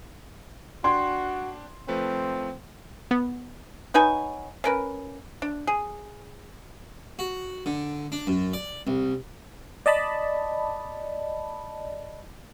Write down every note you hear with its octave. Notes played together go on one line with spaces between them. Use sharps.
D4 F#4 G5 C6 G#6
F3 A3 C4 B4
B3
F#3 D#4 B4 G#5
C#4 A#4 B4
D4
G#4
F#4
D3
D4
F#2
D5
C2
D5 D#5 A5 B5